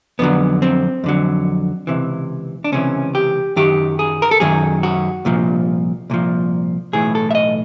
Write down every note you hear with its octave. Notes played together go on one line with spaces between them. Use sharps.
F2 D3 F#3 B3
C4
F2 D3 F#3
C#2 C3 E3
D4
C#2 C3 E3 C#4
G4
F#2 D#3 F#3 G4
G#4
A#4
A4
F#2 D#3 F#3 G#4
F#4
C2 A#2 F3
C2 A#2 F3
B1 A2 E3 G#4
A4
E5
D#5